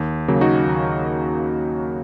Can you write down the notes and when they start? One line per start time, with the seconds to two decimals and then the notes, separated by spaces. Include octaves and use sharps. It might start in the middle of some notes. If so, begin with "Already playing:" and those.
Already playing: D#2
0.28 C#3 F#3 A#3
0.41 D#4 F#4
0.67 D#2